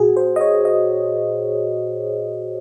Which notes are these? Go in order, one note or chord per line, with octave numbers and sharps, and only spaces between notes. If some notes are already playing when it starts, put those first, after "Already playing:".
Already playing: A#2 F#4 G#4
C5
D#5
C#5
D#5